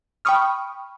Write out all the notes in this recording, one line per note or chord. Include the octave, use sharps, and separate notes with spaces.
G5 B5 C#6 D#6 F6